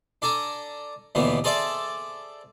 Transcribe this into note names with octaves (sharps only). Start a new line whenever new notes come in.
D4 A4 G#5 A#5
D#2 B2 D3 E3 B3
G#4 A4 C5 D5 E5 A5